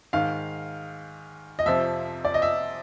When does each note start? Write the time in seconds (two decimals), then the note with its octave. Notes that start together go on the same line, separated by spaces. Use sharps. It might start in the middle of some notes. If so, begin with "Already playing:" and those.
0.13 G#2 D#3 F5
1.59 D#5
1.66 F2 C3 F3 E5
2.25 D5
2.34 D#5
2.42 E5